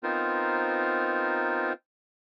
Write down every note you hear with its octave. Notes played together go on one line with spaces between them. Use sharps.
B3 C4 D#4 F4 A#4 C5